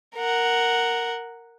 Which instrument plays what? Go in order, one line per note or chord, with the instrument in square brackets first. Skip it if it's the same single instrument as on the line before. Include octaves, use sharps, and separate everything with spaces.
[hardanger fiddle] A#4 F#5